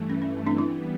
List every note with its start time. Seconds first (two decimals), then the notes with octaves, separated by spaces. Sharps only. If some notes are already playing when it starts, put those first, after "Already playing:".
Already playing: G2 E3 A3
0.10 C#4
0.22 C#4
0.46 C4 D4
0.58 E3 G3 B3 D4 E4